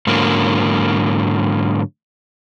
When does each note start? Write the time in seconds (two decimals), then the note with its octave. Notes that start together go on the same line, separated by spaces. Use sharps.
0.07 G#2 D3 F#3 A#3